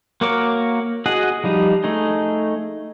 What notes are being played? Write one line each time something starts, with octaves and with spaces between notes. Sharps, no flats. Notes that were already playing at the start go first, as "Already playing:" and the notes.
A#3 F#4 A#4 C#5 D6
F#4 G#4 D#5 F#5
F3 G3 D#4
A3 D#4 G#4